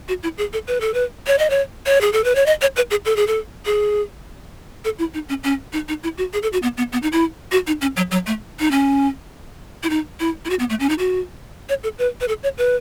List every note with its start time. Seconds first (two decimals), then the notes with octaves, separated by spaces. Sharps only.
0.08 F#4
0.23 E4
0.38 G#4
0.53 A4
0.68 B4
0.81 A4
0.94 B4
1.27 C#5
1.38 D#5
1.50 C#5
1.86 C#5
2.01 G#4
2.13 A4
2.24 B4
2.35 C#5
2.46 D#5
2.61 C#5
2.76 B4
2.91 G#4
3.05 A4
3.16 G#4
3.27 A4
3.66 G#4
4.85 A4
4.99 E4
5.14 D#4
5.29 C#4
5.44 C#4
5.73 D#4
5.88 D#4
6.03 E4
6.18 F#4
6.33 G#4
6.43 A4
6.53 F#4
6.62 B3
6.78 B3
6.93 B3
7.03 D#4
7.12 E4
7.52 F#4
7.67 D#4
7.81 C#4
7.97 F#3
8.11 F#3
8.27 A3
8.60 D#4
8.71 C#4
9.83 E4
9.90 D#4
10.20 E4
10.45 E4
10.50 F#4
10.59 B3
10.70 A3
10.80 C#4
10.89 D#4
10.99 F#4
11.69 C#5
11.83 A4
11.98 B4
12.21 B4
12.28 A4
12.43 C#5
12.58 B4